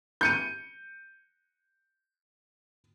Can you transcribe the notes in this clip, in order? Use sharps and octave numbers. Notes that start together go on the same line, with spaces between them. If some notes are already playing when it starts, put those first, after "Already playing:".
G6 C#7 D#7